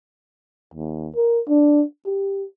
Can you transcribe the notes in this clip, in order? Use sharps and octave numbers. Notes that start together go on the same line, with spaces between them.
D#2
A#4
D4
G4